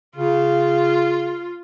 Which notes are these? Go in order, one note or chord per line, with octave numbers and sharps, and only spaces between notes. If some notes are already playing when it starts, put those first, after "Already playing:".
C#3 F4